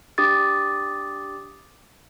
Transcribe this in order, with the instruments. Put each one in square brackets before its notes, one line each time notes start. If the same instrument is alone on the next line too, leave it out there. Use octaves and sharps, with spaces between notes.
[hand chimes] D4 G4 D6 D#6 A6